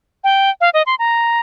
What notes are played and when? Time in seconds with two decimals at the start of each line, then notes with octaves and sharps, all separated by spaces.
0.24 G5
0.61 F5
0.74 D#5
0.86 C6
0.99 A#5